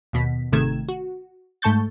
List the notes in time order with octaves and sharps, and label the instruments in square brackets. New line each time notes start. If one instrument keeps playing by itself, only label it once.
[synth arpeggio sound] D#2 B2 B6
G#1 C3 D#3 A3 G#6 E7
F#4
G#2 A3 A5 C#6 G6 A6